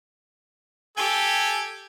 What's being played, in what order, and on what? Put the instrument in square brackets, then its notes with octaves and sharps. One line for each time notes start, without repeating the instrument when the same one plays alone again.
[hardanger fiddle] G4 [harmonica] A4 G#5